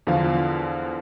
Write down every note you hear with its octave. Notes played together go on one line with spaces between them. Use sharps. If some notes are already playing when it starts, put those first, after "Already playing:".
E2 D3 F3 F5